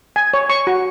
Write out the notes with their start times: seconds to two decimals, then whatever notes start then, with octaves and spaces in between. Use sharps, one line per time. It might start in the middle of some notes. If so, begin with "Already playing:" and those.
0.16 G#5
0.34 C#5
0.50 C#6
0.67 F#4